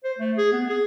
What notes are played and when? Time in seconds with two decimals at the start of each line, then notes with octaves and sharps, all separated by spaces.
0.04 C5
0.18 A3
0.37 G#4
0.52 B3
0.69 G#4